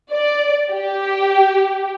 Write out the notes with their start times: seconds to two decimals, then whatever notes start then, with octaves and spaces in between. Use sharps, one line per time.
0.12 D5
0.71 G4